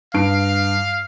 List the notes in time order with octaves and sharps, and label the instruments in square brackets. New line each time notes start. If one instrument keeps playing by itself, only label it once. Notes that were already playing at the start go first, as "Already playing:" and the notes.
[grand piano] G2 D7 [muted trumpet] F5